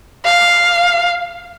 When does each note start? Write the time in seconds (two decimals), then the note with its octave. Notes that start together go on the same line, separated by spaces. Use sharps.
0.25 F5